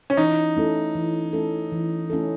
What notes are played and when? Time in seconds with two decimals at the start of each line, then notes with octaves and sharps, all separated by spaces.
0.10 C#4
0.17 E3 D#4
0.57 A3 C#4 E4 A4
0.95 E3
1.33 A3 C#4 E4 A4
1.72 E3
2.10 A3 C#4 E4 A4